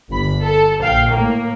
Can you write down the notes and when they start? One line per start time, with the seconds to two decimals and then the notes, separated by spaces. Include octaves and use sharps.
0.10 G1 B5
0.43 A4
0.81 A#1 F5 G5
1.10 A2 A#3